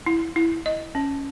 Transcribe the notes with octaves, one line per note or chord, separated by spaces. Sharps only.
E4
E4
D#5
C#4